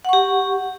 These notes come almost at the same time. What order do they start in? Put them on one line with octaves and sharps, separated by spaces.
F#5 C#6 G4